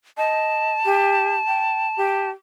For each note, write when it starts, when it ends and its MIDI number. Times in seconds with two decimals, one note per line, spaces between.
0.17 0.73 75
0.17 2.30 81
0.85 1.36 67
1.47 1.88 79
1.97 2.30 67